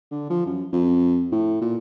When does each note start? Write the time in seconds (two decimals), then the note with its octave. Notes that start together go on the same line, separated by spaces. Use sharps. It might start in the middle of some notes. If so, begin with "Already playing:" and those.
0.11 D3
0.30 F3
0.46 F#2
0.73 F2
1.32 A2
1.61 A#2